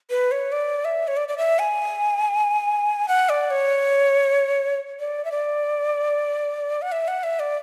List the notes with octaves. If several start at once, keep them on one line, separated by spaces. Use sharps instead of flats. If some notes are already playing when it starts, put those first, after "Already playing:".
B4
C#5
D5
E5
C#5
D5
D5
E5
G#5
F#5
D5
C#5
D5
E5
D5
F#5
E5
F#5
E5
D5